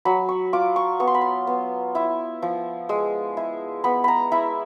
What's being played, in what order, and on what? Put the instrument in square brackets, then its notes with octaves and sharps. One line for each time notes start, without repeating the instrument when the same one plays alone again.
[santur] F#3 B5
C#6
F4 D6
C#6
B3 C#6
C6
B5
C6
B3
E4
F3
G#3
E4
B3 B5
A#5 B5
E4 B5